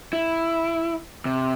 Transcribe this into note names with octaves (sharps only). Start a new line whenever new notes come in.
E4
C3